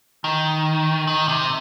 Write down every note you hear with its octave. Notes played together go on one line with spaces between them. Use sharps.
D#3
D#3
C3